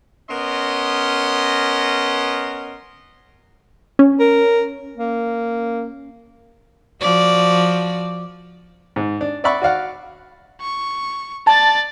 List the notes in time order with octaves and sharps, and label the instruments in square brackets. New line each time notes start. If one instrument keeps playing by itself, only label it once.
[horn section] B3 C#4 A#4 D#5 C6
[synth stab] C#4
[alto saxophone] A#4
A#3
[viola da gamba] F3 F#4 D5
[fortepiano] G#2
D4
D5 E5 F#5 B5 C#6
F#4 D5 F5 F#5
[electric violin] C#6
[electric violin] D5 A6 [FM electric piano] A5